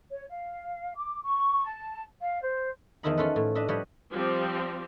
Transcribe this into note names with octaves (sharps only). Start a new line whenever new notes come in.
C#5
F5
D6
C#6
A5
F5
C5
E2 D#3 F3 E4 D#5 B5
C#4 F4 A4 B4
A2
D4 B4 D#5 E5
F3 G3 B4 C#5 D#5
F3 G3 C4 G4